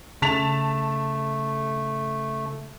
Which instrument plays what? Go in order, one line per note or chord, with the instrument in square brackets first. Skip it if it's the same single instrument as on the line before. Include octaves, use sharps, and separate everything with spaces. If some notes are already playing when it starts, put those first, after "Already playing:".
[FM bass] C#3 [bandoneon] A3 [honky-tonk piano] A5 B6 F7